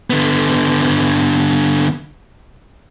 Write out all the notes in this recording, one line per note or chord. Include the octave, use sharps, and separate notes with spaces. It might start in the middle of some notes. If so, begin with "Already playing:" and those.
D3 B3